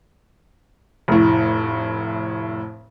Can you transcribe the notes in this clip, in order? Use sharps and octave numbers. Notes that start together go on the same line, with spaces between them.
F1 A2